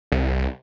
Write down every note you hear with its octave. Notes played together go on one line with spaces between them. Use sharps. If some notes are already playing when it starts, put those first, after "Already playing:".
C2